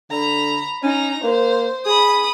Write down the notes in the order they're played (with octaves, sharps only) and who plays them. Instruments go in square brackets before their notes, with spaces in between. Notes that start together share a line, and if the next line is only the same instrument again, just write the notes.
[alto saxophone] D3 [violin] A#5 B5
[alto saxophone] C#4 [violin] D#4 A#5
[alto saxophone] A#3 [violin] C5
[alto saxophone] G#4 [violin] B5 D#6